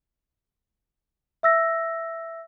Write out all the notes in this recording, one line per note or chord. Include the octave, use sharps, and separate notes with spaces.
E5 E6 A#6